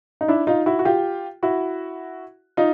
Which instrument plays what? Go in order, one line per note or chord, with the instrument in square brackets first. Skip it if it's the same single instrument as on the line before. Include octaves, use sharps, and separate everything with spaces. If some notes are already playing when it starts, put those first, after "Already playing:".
[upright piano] D#4
D4 E4
D#4 F4
E4 F#4
F#4
F4 G4
E4 F#4
D#4 F4